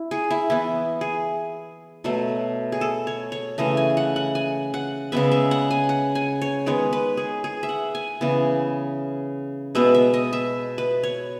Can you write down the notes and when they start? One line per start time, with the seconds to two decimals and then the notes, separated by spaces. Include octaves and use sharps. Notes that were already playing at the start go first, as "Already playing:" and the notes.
Already playing: E4
0.11 G#4
0.31 E4
0.50 E3 B3 E4
1.01 G#4
2.04 B2 F#3 A3
2.72 G#4
2.81 A4
3.07 C#5
3.32 C#5
3.58 C#3 E3 A3 D#5
3.77 G#5
3.97 F#5
4.16 F#5
4.35 G#5
4.74 F#5
5.12 C#3 G#3 B3 E5
5.32 E5
5.51 F#5
5.71 G#5
5.89 F#5
6.15 G#5
6.42 C#5
6.66 D#3 G#3 B3 C#5
6.93 B4
7.17 G#4
7.44 G#4
7.63 E5
7.69 F#5
7.95 G#5
8.21 C#3 E3 B3
9.75 B2 G#3 B3 E5
9.95 E5
10.14 D#5
10.33 E5
10.78 B4
11.03 C#5